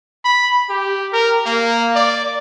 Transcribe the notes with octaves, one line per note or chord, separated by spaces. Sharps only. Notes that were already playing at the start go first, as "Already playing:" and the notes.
B5
G4
A#4
A#3
D5